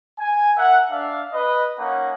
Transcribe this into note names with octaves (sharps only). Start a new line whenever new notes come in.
G#5
A#4 E5 F#5
D4 E5 F5
B4 D#5
A#3 C#4 D#4 F#5